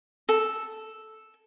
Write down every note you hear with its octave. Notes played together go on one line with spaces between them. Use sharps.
A4